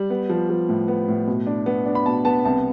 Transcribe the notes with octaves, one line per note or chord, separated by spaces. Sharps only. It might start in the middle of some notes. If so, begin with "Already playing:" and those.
Already playing: G3
B3
F3
F3
A2
B3
A2
B2
D4
B3
D4
B5
B2 A5
B3 A5
C2 A5